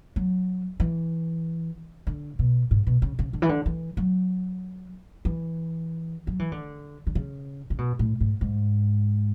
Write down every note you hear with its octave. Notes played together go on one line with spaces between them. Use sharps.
F#3
E3
D3
B2
G#2
B2
C#3
C#3
D3
E3
D3
E3
F#3
E3
F#3
E3
D3
D3
C#3
C#3
B2
A2
G#2
G#2